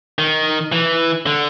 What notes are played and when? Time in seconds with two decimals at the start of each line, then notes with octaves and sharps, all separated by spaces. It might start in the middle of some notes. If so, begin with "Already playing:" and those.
0.19 D#3
0.72 E3
1.26 D3